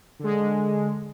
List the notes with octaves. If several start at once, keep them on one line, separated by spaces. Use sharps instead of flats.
D3 G#3